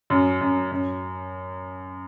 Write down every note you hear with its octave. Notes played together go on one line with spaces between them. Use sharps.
F#2
F#2
F#2